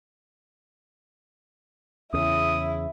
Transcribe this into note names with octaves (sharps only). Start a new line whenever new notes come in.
E2 C#3 E4 D#6